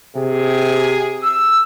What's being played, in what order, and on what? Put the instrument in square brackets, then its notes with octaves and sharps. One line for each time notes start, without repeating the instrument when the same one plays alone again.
[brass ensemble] C3 G#4
[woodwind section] E6